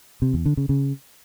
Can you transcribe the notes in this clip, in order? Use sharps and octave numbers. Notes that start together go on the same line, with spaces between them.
C3
E2
D3
C#3
C#3